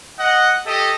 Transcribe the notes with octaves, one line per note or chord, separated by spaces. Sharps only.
D#5 F#5
G4 A4 D#5